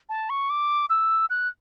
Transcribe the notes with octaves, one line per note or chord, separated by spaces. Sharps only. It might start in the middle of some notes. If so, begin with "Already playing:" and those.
A5
C#6
D6
E6
F#6